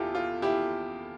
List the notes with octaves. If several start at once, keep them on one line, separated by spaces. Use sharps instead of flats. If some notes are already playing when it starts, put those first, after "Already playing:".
Already playing: E2 E4 F4 G4 A4
F4
E4 G4